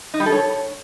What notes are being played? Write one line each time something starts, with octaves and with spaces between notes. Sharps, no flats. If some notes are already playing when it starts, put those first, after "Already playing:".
D#4
G3
A4
C#5